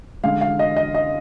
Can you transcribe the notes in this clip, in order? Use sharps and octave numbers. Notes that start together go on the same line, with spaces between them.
D3 G#3 F5
F5
D#5
D#5
D#5